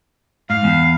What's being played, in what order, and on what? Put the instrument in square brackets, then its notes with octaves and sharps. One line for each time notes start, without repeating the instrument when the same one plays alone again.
[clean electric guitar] G#2 [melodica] F5
[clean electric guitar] E2